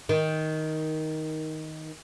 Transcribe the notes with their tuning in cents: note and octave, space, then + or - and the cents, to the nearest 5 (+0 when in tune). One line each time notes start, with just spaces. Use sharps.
D#3 +10